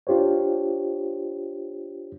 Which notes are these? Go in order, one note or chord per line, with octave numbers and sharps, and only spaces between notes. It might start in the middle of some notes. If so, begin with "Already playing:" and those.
D4 F4 G4 C5 C#5